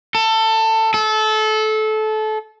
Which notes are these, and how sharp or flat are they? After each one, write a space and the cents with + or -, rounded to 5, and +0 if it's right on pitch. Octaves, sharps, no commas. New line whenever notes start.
A4 +20
A4 -25